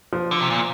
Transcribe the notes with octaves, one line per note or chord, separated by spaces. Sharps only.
F3
D3
C3
A#2